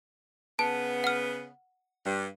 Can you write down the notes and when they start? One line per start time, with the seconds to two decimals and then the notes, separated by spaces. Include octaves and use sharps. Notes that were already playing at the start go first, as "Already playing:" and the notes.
0.59 C#3 B3 A5
1.04 F#5 F6
2.06 G2